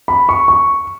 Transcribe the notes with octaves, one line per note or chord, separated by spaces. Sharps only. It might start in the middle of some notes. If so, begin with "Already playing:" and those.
B5
C#6
C#6